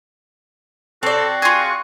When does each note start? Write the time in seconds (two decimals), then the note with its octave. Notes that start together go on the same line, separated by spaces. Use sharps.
1.03 C4 F#4 A4 D5
1.42 F4 G#4 C#6